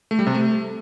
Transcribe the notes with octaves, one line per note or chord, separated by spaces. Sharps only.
A3
G3
C3
A3